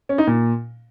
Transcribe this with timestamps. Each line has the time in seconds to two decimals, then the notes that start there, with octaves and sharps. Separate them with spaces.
0.09 C#4
0.18 D#4
0.27 A#2